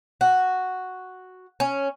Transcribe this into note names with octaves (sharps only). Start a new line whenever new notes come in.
F#4
C#4